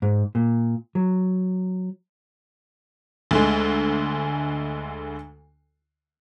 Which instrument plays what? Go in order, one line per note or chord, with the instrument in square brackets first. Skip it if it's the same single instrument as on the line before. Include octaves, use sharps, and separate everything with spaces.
[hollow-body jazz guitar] G#2
A#2
F#3
[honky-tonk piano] D2 D3 G#3